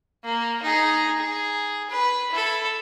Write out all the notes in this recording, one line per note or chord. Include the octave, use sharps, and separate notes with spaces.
A#3
D#4 G#4
G#4
B4
E4 A4